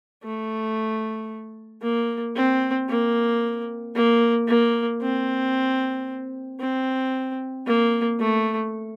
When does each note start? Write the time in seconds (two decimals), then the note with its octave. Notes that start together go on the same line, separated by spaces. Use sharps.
0.24 A3
1.83 A#3
2.36 C4
2.89 A#3
3.95 A#3
4.47 A#3
5.01 C4
6.60 C4
7.66 A#3
8.19 A3